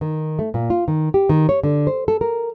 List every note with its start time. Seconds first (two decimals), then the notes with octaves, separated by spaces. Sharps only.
0.01 D#3
0.39 A3
0.54 A#2
0.70 F4
0.88 D#3
1.14 G4
1.29 D#3
1.49 C#5
1.63 D3
1.87 C5
2.08 A4
2.21 A#4